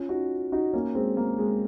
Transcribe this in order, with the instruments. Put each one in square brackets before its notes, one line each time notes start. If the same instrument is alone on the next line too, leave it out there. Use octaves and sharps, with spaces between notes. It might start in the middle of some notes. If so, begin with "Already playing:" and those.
Already playing: [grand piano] C#4 F4
D#4 F#4
D#4 F#4
A#3 C#4
G#3 C4
A#3
G#3